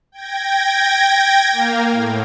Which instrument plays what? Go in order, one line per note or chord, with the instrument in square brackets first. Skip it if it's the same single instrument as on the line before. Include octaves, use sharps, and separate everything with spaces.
[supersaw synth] G5 G#6 A#6
A#3 F5
A2